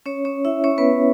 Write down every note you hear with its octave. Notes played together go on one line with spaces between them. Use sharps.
C#4 C#5
C#4 C#5
E4 E5
C#4 C#5
B3 B4